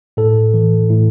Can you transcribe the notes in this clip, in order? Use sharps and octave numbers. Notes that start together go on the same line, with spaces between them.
A2 A4
E3
A2